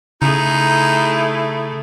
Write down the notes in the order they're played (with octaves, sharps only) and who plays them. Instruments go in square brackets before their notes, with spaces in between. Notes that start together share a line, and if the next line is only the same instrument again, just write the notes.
[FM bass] C#3 [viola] A3 G#4 [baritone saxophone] D#4 [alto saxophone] E4